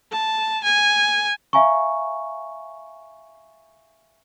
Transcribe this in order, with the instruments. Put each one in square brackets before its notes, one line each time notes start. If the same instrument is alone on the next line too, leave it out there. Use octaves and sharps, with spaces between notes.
[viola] A5
G#5
[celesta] E5 F5 G#5 A#5 C#6